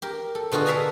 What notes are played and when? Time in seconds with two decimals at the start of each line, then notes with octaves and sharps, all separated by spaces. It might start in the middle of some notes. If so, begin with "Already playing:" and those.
0.02 G4 A#4
0.35 A4
0.52 B2 D3 F4 F#4 G#4
0.66 A4 A#4 E5 F5 G#5 A#5